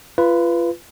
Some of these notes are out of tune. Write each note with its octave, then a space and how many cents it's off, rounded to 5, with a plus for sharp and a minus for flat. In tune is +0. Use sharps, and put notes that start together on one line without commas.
F4 -25 B4 +0